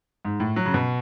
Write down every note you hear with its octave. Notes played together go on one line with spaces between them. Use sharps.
G#2
A2
F#3
C#3
B2